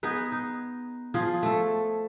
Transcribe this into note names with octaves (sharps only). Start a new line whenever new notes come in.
B3 D#4 G#4 B4
D#4
F3 F4 G#4
A3 A4